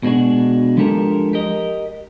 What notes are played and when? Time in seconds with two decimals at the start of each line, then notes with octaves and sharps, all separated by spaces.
0.03 B2 G#3 D4 F#4
0.77 F3 G#3 D4 G4 A4 A#4
1.33 G4 A#4 D#5